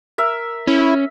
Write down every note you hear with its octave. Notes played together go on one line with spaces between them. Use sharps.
A#4 E5
C#4 E4